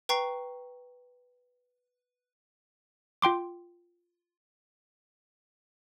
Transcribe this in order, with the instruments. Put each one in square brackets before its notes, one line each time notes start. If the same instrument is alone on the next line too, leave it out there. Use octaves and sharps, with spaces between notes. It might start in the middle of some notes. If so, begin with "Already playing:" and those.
[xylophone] B4 G5 A#5 C#6 C7
[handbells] F4 G5 C6 D6